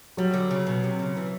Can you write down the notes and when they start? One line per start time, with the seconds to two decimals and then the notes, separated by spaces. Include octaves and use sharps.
0.17 F#3 G3
0.34 D3
0.51 C#3
0.67 B2
0.84 C3
0.99 C#3
1.17 E3